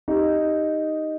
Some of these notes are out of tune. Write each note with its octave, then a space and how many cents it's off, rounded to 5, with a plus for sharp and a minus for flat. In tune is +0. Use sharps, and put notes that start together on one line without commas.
D#4 +0 G4 +0